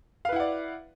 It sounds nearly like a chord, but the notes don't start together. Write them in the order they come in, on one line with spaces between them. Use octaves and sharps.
F5 B4 E4 F#5 D5